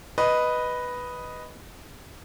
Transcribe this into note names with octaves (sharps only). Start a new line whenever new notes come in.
B4 D#5